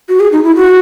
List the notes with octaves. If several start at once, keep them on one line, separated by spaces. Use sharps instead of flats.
F#4
G#4
D#4
E4
F#4